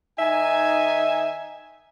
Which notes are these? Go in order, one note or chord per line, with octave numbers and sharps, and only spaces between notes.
D#3 D#4 E5 G#5